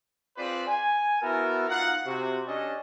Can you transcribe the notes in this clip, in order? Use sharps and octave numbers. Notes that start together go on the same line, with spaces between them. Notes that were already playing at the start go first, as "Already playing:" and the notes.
C4 F4 G#4 B4 C5 D5
G#5
B3 E4 F#4 A4 A#4
D#4 F4 F5 F#5
C3 F#4
C#4 D4 G4 A4 D#5